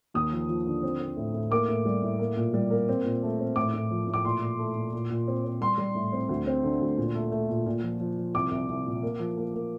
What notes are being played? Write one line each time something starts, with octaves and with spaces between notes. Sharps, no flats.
D#2 D#6
F3
F3
D3
C4
C4
A2
A2
A#3 D6
A2
G3
A2
A#3
A#2
G3
A#3
C4
A#2
A3
C4
A2 D6
A2
F3
A2
D6
A#2 C6
A#2
A3
A#2
A#2
A#2
C4
C4
G3 C6
G3
A2
C4
D2
C4
D3
D2
A#2
A3
A3
A#2
A#2
F3
F3
F3
C2 D6
C2
C2
A#2
A#3
F3
A#3
A#3